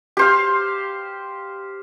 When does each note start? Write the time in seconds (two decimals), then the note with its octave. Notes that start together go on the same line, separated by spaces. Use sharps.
0.17 G4 C5 F5